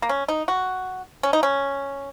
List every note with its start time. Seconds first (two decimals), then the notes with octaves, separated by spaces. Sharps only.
0.02 A#3
0.09 C#4
0.28 D#4
0.48 F#4
1.23 C#4
1.33 D#4
1.43 C#4